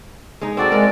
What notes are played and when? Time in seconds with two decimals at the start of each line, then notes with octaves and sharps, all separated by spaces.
0.41 G#3 D#4
0.57 C4 F#4 A4 D5
0.72 G#3 A#4